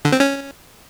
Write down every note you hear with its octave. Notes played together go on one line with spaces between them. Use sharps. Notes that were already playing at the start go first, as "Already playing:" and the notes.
D3
C4
C#4